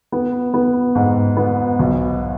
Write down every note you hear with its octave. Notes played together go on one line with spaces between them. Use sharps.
B3
B3
G#2
B3
B1